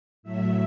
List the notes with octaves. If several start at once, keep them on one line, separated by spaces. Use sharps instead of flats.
A2 F#3 A3 E5